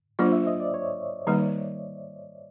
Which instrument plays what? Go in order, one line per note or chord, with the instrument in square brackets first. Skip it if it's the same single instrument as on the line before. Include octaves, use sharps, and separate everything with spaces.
[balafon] F#3 A#3 D4 F4 [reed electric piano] C5
[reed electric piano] E5
D#5
D5
C#5
[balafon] D#3 G3 A#3 D#4